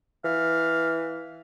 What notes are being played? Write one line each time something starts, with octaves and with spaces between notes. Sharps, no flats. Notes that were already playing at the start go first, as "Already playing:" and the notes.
E3 F5